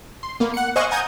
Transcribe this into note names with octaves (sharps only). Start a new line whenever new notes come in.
C6
A#3 B3
F#5 C#7
C5 D#5 F5 G#5 C#6 F#6
F#5 G#5 A#5 D#6 G6 G#6